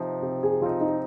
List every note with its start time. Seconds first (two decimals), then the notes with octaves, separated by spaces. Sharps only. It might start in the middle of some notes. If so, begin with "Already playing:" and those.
Already playing: C3 F3 C4 D#4
0.22 C3
0.43 G#4
0.62 F3 C4 D#4 F4
0.81 D#4